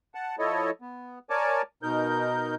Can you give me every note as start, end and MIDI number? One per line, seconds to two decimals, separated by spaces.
0.15 0.36 78
0.15 0.36 81
0.39 0.70 53
0.39 0.70 64
0.39 0.70 69
0.39 0.70 73
0.39 0.70 75
0.82 1.19 59
1.30 1.62 70
1.30 1.62 73
1.30 1.62 74
1.30 1.62 80
1.30 1.62 81
1.30 1.62 86
1.83 2.55 47
1.83 2.55 63
1.83 2.55 70
1.83 2.55 91